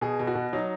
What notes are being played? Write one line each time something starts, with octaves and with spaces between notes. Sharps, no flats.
B2 G#4
B2
F#4
B2
F#3 D#4